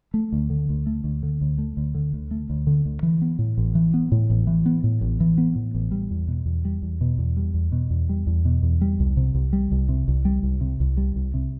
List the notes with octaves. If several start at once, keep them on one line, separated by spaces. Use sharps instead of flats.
A3
D2
D3
D2
A3
D2
D3
D2
A3
D2
D3
D2
A3
D2
D3
D2
E3
B3
A2
A1
E3
B3
A2
A1
E3
B3
A2
A1
E3
B3
A2
A1
G3
E2
B2
E2
G3
E2
B2
E2
G3
E2
B2
E2
G3
E2
B2
E2
G3
C2
C3
C2
G3
C2
C3
C2
G3
C2
C3
C2
G3
C2
C3